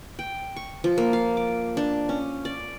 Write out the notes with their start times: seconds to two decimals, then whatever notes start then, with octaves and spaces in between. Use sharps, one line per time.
0.19 G5
0.56 C#6
0.84 F3
0.98 A#3
1.13 F5
1.37 D6
1.77 D4
2.09 C#4
2.45 D5